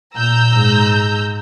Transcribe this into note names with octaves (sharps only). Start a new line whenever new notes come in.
A#2 A#5 E6 G6
G#2 G#3